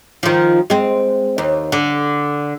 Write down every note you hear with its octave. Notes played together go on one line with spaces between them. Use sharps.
D#3 F3
G#3 C4
D#2
D3